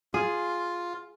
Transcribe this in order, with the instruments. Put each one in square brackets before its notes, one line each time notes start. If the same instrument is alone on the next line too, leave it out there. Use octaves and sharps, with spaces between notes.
[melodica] F4 [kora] G#4